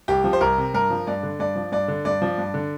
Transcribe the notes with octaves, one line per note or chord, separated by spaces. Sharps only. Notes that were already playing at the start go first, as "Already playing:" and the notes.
C2 G4
F3
C5
C2 A#4
C3
G2 A#4
F3
G2 D5
D3
G2 D5
F3
G2 D5
D3
G2 D5
F3
G2
D3